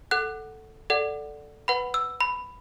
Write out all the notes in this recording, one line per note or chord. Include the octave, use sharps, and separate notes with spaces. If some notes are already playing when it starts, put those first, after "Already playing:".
A4 F#5 F#6
A4 D5 F#5
B4 F#5 B5
E6
B5